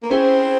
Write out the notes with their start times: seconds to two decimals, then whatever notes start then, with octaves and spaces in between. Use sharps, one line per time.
0.03 A#3
0.10 C4 C#4 E4 G#4 C5